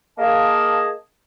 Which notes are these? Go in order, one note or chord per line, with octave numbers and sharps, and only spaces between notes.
A#3 G#4 D#5 A5